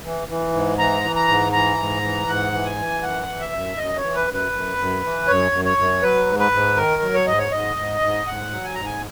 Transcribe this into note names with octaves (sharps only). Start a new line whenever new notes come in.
E3
E3
G#2
E3 A#5
E3
A#5
G#2
E3 A#5
G#2
E3
G#2 F#5
E3
G#5
E3
F#2 F#5
E3
E5
F#2
F#2 D#5
C#5
E3
B4
F#2
B4
F#2
F#2
E3
F#2 C#5
F#2
C#5
F#2
F#3 B4
G#2
B4
G#2
D#3 A#4
F#3
C#5
G#2 D#5
C#5
G#2 D#5
G#2
G#2
G#2 F#5
F#3
G#5
G#2 A#5
G#5